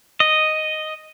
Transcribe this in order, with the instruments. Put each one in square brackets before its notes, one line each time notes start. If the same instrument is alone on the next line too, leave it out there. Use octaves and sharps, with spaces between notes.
[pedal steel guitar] D#5